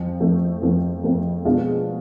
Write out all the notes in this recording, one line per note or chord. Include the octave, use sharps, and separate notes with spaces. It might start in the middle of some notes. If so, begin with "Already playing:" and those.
Already playing: F2 F3
F2 F3 A3
F2 F3 A3
F2 F3 A3
B2 G#3 D4 F4 G#4